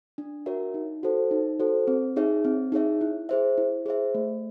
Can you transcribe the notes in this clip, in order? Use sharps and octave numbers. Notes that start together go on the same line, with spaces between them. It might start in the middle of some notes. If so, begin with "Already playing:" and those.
D4
F#4 A#4 C#5 E5
D#4
F#4 A4 C5
D#4
F#4 A4 C5
C4
D#4 G#4 C#5 E5
C4
D#4 G#4 C#5 E5
E4
G#4 C5 E5
E4
G#4 C5 E5
A3